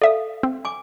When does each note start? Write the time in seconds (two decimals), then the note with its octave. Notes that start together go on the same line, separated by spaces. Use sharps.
0.02 A4 D5 E5 F5 D#6
0.43 C4
0.65 G#5 D6